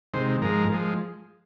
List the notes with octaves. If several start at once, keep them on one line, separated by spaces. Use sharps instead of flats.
C3 D#3 G#3 C5
G#2 F3 G#3 A#4
F3 G#3